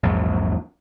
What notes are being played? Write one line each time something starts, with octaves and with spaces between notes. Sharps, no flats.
A#1 E2 G#2 F#3